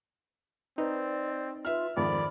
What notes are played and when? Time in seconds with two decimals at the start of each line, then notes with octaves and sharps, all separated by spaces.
0.78 C4 D#4 B4 D5 D#5
1.65 F4 B4 E5 F6
1.97 F2 G#2 D#3 D5 B5